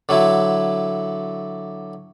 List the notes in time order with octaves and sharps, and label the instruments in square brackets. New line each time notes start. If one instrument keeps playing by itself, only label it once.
[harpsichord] D3 F#3 E4